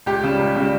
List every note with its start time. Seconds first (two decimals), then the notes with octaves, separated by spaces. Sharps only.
0.06 C#2 G4
0.23 C#3 G3
0.39 C#2
0.56 C#3 G3